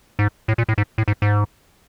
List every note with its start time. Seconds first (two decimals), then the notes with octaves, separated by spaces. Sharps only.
0.19 G#2
0.48 A2
0.58 A#2
0.69 A2
0.78 G#2
0.98 A2
1.08 G#2
1.22 G#2